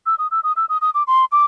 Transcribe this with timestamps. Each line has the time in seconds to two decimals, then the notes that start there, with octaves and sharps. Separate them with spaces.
0.06 E6
0.18 D#6
0.31 E6
0.44 D#6
0.56 E6
0.69 D#6
0.81 D#6
0.94 D6
1.07 C6
1.32 D6